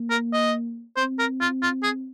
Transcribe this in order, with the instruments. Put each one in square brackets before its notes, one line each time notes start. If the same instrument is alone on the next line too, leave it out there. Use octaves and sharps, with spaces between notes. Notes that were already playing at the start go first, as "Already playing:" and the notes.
Already playing: [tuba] A#3
[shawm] A#4
D#5
[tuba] C4 [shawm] C5
[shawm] A#4
F4
F4
G#4